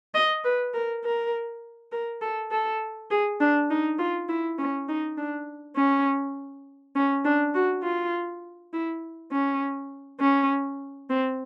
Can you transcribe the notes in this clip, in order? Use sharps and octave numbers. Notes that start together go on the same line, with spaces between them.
D#5
B4
A#4
A#4
A#4
A4
A4
G#4
D4
D#4
F4
E4
C#4
D#4
D4
C#4
C#4
D4
F#4
F4
E4
C#4
C#4
C4